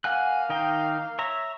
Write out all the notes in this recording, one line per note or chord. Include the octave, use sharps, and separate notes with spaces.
A#3 F5 F#5 G#5 F#6
D#3 D#4 G5
C#5 E5 A#5